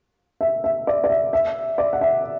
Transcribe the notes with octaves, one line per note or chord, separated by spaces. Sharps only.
E5
E5
D5
D5
E5
E5
D5
F#5
E5